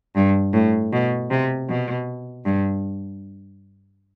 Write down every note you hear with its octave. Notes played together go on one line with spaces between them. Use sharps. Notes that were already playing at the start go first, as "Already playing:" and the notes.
G2
A2
B2
C3
B2
G2